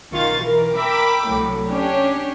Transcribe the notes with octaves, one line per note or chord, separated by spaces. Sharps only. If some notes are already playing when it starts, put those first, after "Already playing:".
B1 D#3 F4 F5 C#6 A6
E3 A#4
A#4 E5 G5 B5 D6
C2 A2 F#3
C#4 D4 G4 C#5